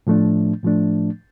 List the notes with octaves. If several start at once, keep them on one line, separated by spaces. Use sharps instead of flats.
A2 F3 A3 D4
A2 F3 A3 D4